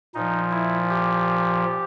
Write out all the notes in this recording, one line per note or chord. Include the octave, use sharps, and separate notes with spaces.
A#2 F3 D#4
E4
G4